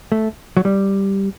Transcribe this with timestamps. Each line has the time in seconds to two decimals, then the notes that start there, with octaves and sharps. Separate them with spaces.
0.12 A3
0.57 F#3
0.65 G3